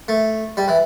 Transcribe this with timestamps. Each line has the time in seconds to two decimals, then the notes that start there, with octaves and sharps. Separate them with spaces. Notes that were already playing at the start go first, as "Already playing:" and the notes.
0.08 A3
0.57 G3
0.68 E3